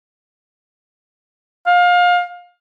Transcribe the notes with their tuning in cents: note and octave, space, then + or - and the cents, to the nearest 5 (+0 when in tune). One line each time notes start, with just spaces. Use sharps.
F5 +25